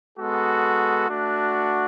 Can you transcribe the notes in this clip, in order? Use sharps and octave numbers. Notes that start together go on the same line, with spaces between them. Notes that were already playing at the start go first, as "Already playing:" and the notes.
G#3 B3 F#4 A4
A3 D4 F#4